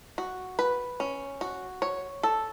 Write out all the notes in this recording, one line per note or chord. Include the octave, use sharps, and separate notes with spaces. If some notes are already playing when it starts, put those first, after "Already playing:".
F#4
B4
C#4
F#4
C#5
A4